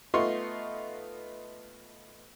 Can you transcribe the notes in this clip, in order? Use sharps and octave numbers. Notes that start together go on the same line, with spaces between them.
A3 B3 D#4 F4 C6 C#6